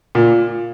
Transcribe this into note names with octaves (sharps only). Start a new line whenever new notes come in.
A#2